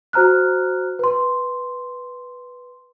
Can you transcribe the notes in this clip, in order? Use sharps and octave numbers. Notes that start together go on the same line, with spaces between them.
F#4 C5 A#5 F6 F#6
B4 C6